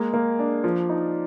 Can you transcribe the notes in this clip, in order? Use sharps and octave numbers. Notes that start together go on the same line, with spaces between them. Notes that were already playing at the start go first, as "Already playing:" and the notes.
Already playing: G#3 A#3
A#3
D4
F3
D#4